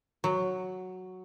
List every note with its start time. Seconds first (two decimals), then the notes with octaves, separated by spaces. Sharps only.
0.24 F#3